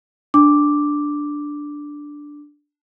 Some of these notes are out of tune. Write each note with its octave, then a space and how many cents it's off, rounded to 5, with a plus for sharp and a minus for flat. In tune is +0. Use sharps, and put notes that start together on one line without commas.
D4 +0 D6 +0